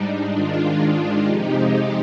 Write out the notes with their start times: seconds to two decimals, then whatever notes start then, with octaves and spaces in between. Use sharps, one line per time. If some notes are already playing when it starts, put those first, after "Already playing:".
Already playing: G#2 G3 D4 D#4
0.32 G#2 D#3 G#3 D4 F4
1.26 F2 C3 F3 G#3 D#4 G4
1.73 D#4